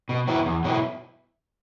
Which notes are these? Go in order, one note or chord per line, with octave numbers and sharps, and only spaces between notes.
B2
F#3 B3 E4
E2
B2 F#3 B3 E4